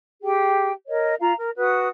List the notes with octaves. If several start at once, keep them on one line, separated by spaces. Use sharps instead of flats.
G4 G#4 G5
A#4 C#5 D#5
F4 F5 A#5
A#4
F#4 B4 F#5 D#6